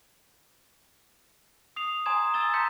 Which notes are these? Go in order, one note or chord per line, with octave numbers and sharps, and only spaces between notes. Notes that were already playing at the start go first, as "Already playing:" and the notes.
D#6 C7 F7
G#5 A#5 C6 D#6 G#6 E7
G#5 D#6 E6 A6 E7 G7
A5 A#5 C6 G6 B6 C#7